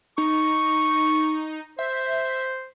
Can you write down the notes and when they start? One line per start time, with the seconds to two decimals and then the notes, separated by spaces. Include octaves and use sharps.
0.18 D#4 C#6
1.79 C5 E5